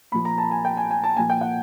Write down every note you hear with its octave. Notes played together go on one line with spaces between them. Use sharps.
A#2 F3 B5
A#5
A5
G#5
G5
G#5
G#5
A5
A#2 F3 G#5
G5
F#5